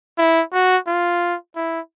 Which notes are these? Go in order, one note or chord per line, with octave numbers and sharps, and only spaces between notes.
E4
F#4
F4
E4